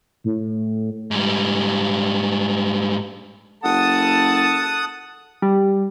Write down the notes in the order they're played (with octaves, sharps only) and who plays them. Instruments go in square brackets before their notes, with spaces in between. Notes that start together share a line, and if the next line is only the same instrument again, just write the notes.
[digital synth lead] A2
[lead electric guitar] G#2 G3
[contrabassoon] F#1 [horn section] A4 A5 [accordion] F#5 D#6
[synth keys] G3